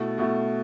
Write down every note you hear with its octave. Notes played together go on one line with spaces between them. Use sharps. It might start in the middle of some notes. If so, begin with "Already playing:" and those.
Already playing: B2 A3 E4
B2 A3 E4